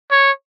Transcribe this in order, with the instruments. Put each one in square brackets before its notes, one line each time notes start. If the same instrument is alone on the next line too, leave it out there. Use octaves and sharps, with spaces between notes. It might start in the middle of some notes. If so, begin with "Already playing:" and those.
[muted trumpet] C#5